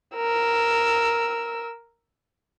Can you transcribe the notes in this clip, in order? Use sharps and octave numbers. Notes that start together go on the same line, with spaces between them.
A#4 E6